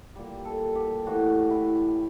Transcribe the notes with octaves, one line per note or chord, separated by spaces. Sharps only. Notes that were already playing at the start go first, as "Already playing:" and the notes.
A#2 G3
A4
G4
A2 E3 G3 F#4
E4